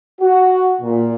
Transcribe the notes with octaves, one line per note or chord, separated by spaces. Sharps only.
F#4
A#2